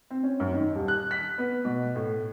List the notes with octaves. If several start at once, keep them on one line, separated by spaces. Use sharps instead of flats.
C4
C#4
F#2
D#3
D#1
F#6
B6
B3
B2
A2